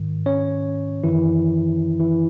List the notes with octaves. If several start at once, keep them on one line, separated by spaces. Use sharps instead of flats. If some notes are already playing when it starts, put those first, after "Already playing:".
Already playing: G#2 D#3
C#4 C#5
F#2 D#3 E3 E4
E3 E4